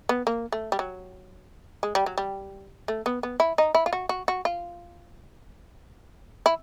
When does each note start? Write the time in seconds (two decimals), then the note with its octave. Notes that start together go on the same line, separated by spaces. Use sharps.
0.09 B3
0.27 A#3
0.52 A3
0.72 G3
0.79 F#3
1.83 G#3
1.95 G3
2.06 F#3
2.18 G3
2.88 A3
3.06 B3
3.23 B3
3.40 E4
3.58 D#4
3.75 E4
3.86 F4
3.93 F#4
4.09 F#4
4.28 F#4
4.45 F4
6.46 E4